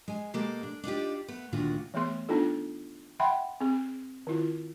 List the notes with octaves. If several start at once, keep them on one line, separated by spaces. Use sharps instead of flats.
G#3 G#5
B2 G#3 A#3 G4 A4
D4
D4 D#4 F4 G4
A3 B3
D2 A#2 D3 D#3 F4 F#4
E3 A3 B3 G#4 C6
B3 D4 D#4 F4 A4
E5 F#5 G5 B5 C6
C4 G#4
D#3 E4 F4